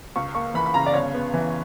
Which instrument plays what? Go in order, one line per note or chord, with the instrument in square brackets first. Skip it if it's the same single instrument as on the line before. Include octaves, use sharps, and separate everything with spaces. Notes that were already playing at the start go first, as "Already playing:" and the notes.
[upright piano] C#2 C#6
A#3 C#6
E3 B5
B5
C#3 A#5
D5
G1 C#5
B3
E3